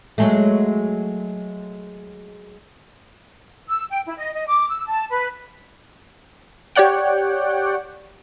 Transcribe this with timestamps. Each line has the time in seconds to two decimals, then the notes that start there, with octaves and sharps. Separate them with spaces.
0.18 F#3 G#3 A3
3.68 E6
3.89 G5
4.06 E4
4.17 D#5
4.33 D#5
4.46 D6
4.69 E6
4.86 A5
5.10 B4
6.75 G4 C#5 D5 F#5 G5